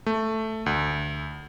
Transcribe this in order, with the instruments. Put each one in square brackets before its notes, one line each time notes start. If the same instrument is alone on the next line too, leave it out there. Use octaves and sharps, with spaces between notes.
[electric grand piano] A3
D2